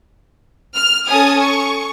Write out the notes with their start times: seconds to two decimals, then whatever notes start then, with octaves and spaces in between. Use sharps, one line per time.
0.74 F6
1.08 C#4 A4 G#5 D#6
1.42 C#6